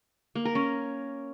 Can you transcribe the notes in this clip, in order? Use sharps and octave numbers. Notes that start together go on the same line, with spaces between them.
A#3
A#4
C#4